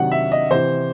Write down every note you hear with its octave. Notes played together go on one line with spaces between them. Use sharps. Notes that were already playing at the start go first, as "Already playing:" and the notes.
Already playing: C3 D#3 F#3 F#5
E5
D#5
C3 E3 C5